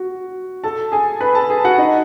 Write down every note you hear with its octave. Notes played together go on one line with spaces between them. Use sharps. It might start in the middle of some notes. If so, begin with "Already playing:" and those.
Already playing: F#4
A4 A5
G#4 G#5
B4 B5
A4 A5
G#4 G#5
F#4 F#5
D#4 D#5